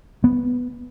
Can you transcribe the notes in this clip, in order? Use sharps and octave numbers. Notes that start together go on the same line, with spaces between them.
B3